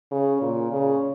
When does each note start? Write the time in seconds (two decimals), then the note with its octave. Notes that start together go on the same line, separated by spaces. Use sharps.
0.11 C#3
0.42 A#2
0.72 C#3